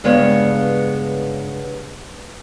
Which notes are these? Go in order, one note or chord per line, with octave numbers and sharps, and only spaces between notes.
G2 C#3 G#3 B3 C#5